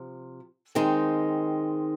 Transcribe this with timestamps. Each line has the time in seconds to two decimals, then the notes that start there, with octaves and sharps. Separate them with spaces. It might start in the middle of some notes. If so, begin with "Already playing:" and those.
Already playing: C3 F3
0.75 D#3 G#3 C4 D#4